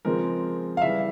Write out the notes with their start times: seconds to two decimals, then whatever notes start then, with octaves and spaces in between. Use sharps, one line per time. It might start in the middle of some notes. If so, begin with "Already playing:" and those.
0.05 C#3 F3 G#3 C4 A#4
0.77 F5
0.82 C#3 E3 G3 E5